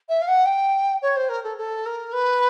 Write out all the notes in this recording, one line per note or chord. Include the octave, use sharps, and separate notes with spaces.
E5
F5
F#5
G5
C#5
C5
A#4
A4
A4
A#4
B4